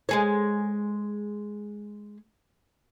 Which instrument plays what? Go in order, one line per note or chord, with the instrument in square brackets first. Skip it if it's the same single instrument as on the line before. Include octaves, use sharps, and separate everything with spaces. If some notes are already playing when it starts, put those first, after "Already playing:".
[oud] G#3 G#4 C#5